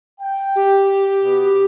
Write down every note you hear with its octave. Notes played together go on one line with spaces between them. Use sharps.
G5
G4
B2 B3